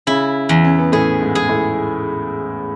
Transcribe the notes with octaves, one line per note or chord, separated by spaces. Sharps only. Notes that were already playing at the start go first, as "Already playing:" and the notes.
C#3 C#4 E4
E2
C#4
B3
A2 A3 G#4
G#2 G#3
G#4
A2 A3